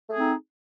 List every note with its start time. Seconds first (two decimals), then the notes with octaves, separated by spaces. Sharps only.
0.09 A3
0.13 G#4
0.16 C4
0.20 D#4